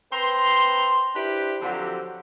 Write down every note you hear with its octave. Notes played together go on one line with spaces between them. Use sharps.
C4 B4 A#5 C6
D4 E4 G4 B4 C5
D3 F3 F#3 C4 F#4 G4